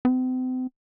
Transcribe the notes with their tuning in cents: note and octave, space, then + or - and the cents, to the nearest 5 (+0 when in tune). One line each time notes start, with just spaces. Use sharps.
C4 -40